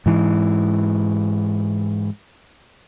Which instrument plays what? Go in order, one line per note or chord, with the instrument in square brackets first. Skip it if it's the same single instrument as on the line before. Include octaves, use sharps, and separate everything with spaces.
[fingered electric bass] G#2 E3